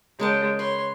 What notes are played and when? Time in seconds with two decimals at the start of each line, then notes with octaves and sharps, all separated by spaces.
0.19 C#3 G#3 A#4 G5 A5
0.59 B4 C#5 C6